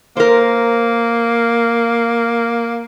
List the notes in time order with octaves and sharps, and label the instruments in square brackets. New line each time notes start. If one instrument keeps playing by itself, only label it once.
[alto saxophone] A#3 [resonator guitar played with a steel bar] A#4 C5